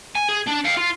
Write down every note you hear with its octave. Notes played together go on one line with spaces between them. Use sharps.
G#5
G#4
D4
F5 G5
F4